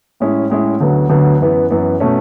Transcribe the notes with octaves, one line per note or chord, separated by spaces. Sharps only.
A2 G#3 C#4 E4
A2 G#3 C#4 E4
D2 D3 F#3 B3
D2 D3 F#3 B3
F#2 E3 B3
F#2 E3 B3
B2 A3 C#4